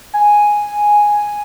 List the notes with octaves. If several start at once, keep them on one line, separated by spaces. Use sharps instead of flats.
G#5